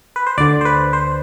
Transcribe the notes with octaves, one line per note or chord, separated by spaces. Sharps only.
B4
C5
D2 D3 D5
C5
B4
C5